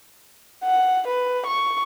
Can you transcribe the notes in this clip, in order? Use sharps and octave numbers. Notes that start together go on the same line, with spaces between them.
F#5
B4
C#6